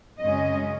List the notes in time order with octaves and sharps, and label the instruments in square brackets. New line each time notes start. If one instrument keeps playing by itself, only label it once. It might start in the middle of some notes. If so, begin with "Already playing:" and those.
[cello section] F#2 C#3 G#3 C#4 D#5